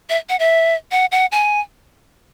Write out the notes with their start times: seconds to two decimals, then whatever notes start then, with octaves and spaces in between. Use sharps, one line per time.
0.10 E5
0.29 F#5
0.39 E5
0.91 F#5
1.12 F#5
1.32 G#5